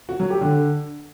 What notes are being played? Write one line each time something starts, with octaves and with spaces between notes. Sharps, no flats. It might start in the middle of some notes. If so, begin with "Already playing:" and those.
F#4
F#3
G4
D3